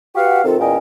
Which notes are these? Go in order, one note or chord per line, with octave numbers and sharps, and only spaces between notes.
F#4 G4 B4 F5 F#5
C3 D#3 C4 F4 A4
E2 A#2 C#4 D#5 G5